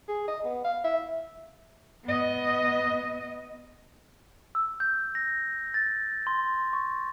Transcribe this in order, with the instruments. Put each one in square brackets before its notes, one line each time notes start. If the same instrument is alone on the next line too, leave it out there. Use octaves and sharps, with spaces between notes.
[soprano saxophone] G#4
D#5
B3
F5
E5
[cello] B3 D#5
[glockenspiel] E6
G6
A#6
A6
C6
C#6